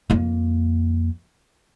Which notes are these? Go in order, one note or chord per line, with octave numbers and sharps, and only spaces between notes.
F2 A#3